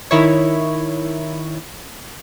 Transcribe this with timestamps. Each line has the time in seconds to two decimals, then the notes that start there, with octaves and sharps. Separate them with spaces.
0.11 D#3 E4 C#5